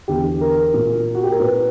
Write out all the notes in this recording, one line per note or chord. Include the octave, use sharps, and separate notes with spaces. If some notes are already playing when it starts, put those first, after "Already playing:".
E2 D3 G4
A#4
A#2
F#4
G4
A#4
A#2 B4